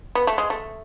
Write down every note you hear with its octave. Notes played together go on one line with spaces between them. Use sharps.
B3
A3
G#3
A3